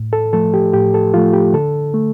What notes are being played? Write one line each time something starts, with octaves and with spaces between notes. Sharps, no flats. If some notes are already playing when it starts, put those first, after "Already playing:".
Already playing: A2
A4
F3 A3 A4
G4
A2 G4
A4
F3 A3 F4
G4
D3 A4
A3